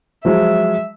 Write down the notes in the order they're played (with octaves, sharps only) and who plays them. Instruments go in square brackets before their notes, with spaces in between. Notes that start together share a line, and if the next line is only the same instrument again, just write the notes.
[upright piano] F3 F#3 G#3 [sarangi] E5